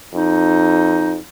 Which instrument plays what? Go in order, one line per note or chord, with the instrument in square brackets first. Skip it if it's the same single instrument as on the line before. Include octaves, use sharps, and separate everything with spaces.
[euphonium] F2 [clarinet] D#4